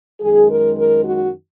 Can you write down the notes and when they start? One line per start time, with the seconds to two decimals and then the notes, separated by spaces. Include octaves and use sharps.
0.20 F#2 D#3 G#3 G#4
0.48 A#4
0.76 A#4
1.04 F#4